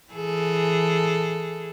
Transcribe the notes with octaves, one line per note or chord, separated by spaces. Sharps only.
E3 G#4 A4